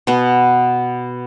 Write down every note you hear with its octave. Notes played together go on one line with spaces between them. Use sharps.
B2 B3